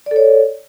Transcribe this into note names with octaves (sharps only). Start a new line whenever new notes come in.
A4 C#5 D5